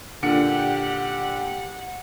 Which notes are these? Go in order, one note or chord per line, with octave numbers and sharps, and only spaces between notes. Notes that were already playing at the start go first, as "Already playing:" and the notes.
A#2 D3 G4 F#5 C#7